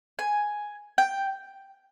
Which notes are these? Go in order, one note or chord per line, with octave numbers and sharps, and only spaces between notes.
G#5
G5